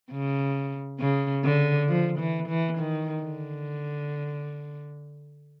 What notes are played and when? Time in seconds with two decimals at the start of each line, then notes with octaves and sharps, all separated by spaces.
0.11 C#3
1.00 C#3
1.44 D3
1.89 F3
2.19 E3
2.48 E3
2.78 D#3
3.22 D3